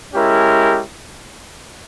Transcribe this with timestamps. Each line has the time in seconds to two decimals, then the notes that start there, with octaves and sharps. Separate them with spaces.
0.14 G#3 C#4 E4 G4 A#4